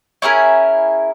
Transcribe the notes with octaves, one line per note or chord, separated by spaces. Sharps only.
C#4 E4 G#4 A#4